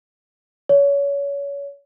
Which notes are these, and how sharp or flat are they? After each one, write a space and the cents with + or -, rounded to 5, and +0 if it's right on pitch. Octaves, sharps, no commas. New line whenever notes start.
C#5 +30